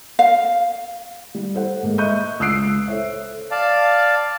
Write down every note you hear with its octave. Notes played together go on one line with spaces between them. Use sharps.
F5
G3
A4 C5 F#5
G#2 G#3 A#3
D#5 E5 C#6 F#6 G6 D#7
C#2 D#6 E6 F#6 C7 D7
A4 C5 C#5 E5
D5 F5 A5